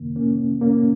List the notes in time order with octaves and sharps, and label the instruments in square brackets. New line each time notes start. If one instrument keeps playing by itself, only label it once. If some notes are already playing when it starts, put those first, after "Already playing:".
Already playing: [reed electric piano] F2 C3 D#3 A#3
A#3 C#4
A#3 C#4
A#3